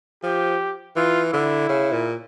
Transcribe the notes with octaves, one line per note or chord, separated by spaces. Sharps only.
F3 G4
E3 F4
D3 E4
C#3
A#2